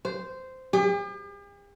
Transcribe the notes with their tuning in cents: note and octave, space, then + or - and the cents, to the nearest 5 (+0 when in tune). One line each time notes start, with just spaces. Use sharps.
C5 -10
G4 +45